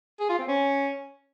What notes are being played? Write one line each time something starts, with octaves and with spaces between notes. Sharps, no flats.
G#4
F4
C4
C#4